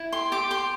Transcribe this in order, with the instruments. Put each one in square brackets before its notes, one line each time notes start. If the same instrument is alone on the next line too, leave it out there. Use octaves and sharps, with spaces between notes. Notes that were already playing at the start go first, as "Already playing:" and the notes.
Already playing: [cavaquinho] E4
G4 C6
G4 D6
G4 C6